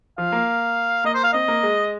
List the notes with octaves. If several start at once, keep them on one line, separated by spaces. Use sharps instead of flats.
F3 F5
A#3
A#3 D#5
C5
F5
C4 D#5
A#3
G#3